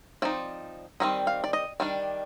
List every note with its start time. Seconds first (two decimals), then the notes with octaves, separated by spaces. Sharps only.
0.22 F3 C4 D#4 D5
1.00 D#3 G3 C4 D#5
1.27 F5
1.44 D5
1.53 D#5
1.80 D#3 G3 D4 D5